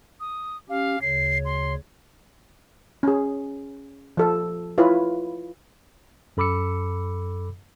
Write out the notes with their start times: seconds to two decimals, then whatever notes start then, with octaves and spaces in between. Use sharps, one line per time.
0.20 D#6
0.70 C#4 G4 F5
1.02 D2 C#3 C#5 C7
1.45 C6
3.03 C#4 G#4
4.17 F3 A4
4.78 E4 F4 B4 C#5
6.37 F#2 A4 B5 D6 E6 C#7